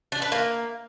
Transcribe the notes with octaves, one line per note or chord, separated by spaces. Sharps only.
D4
B4
A#3